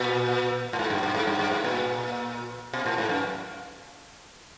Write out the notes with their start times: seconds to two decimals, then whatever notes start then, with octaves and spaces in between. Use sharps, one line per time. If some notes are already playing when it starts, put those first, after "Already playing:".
Already playing: A#2
0.73 A2
0.79 G#2
0.90 G2
1.03 G2
1.14 G#2
1.27 G2
1.39 G2
1.51 G#2
1.64 A#2
2.73 B2
2.86 A2
2.98 G#2
3.09 F#2